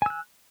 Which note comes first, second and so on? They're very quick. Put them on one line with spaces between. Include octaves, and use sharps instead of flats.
G#5 E6 F#6